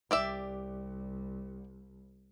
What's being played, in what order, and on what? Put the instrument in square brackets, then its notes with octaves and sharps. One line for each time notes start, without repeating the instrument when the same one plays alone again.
[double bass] C2 [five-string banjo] G4 D5 E5